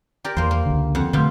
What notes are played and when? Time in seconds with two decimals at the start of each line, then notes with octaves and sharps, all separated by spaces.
0.25 G4 A#4 D5
0.37 E2 A#3 C5
0.51 A#3
0.66 C#2 D3
0.95 F2 F#5
1.13 B2 D3 A3 F4 G4